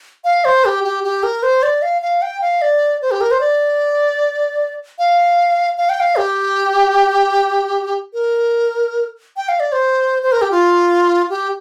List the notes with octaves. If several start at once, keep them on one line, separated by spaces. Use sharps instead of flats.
F5
C5
G4
G4
G4
A#4
C5
D5
F5
F5
G5
F5
D5
C5
G4
A#4
C5
D5
F5
F5
G5
F5
G4
A#4
G5
F5
D5
C5
C5
A#4
G4
F4
G4